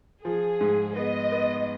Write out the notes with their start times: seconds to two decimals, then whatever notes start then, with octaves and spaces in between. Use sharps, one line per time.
0.24 F3 G#4
0.61 G#2
0.96 B3 D#5
1.32 B3